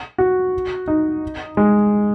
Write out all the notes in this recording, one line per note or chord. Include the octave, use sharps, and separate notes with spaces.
F#4
D#4
G#3